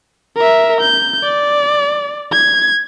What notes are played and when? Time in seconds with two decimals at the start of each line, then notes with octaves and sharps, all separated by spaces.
0.37 A#4 E5
0.81 G6
1.23 D5
2.32 G#6